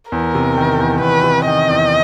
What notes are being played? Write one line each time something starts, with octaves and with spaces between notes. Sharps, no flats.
E2 A#4
C3
D#3
E2
E2 B4
C3
D#3 D#5
E2